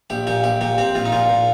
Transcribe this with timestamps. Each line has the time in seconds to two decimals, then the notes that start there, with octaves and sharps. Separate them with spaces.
0.10 A#1 G4
0.27 A#2 G4
0.43 A#1 G4
0.61 A#2 G4
0.78 C4 G4
0.95 A#1 F4
1.05 D#4
1.12 A#2 F4
1.29 A#2